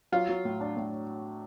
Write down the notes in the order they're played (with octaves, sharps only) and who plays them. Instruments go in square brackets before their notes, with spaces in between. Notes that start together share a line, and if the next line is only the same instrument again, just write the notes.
[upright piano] F#3 [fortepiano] F4
[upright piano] F#3
A2
D4
A2